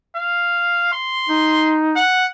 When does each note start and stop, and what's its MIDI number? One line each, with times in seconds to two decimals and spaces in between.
0.16 0.88 77
0.92 1.76 84
1.29 2.00 63
1.96 2.26 78